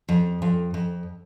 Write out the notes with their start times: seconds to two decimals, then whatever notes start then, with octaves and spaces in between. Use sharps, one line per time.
0.09 F2
0.42 F2
0.74 F2